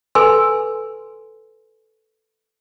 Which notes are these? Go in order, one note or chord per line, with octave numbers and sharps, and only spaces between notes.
A4 B4 G#5 C6 E6